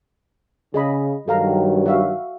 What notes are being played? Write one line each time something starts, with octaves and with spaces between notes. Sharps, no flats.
C#3 G#4 D#5 B5
G2 D#3 F#3 A4 F5 A#5
F#4 E5 F5